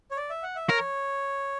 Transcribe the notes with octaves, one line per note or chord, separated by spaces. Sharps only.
C#5
D5
E5
F#5
E5
A#4 C#5